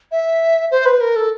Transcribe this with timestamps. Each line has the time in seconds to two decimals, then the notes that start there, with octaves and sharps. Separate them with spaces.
0.11 E5
0.71 C5
0.85 B4
1.01 A#4
1.16 A4